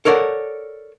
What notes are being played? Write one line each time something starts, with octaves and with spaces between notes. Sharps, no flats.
A4 A#4 C#5 D5 F#5